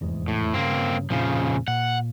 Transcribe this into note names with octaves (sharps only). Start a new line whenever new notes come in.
F1 E2 G#2
A2
G2 C#3 A#3 C4
F2 A#2 C#3 F3 C4
A#2 F#5